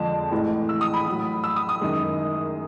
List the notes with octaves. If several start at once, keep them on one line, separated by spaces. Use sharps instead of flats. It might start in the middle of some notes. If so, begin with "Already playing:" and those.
Already playing: F2 D3 F3 G#3 A5
A2 E3 G#3
E6
D#6
B5
A2 F#3
E6
D#6
D#6
F#2 D#3 G#3